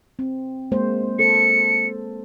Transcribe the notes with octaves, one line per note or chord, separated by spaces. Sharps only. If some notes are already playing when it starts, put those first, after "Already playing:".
C4
G#3 A#3 C5
A4 C5 C#7